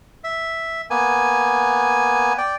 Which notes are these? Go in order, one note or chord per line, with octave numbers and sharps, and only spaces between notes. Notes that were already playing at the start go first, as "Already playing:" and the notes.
E5
A#3 B3 G#5
D5 G5